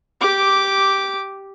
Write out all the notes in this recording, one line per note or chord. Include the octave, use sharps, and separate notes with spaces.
G4 D6